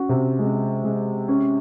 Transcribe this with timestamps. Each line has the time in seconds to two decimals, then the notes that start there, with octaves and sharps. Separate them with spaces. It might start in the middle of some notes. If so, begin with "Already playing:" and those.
Already playing: C#4 F#4
0.09 C3
0.39 G#3
0.84 G#3
1.28 C#4